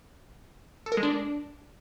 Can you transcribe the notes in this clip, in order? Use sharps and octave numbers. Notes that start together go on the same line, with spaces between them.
A4
A#4
G#3
D4